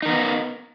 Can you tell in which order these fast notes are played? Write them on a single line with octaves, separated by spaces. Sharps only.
D#4 A#4 B3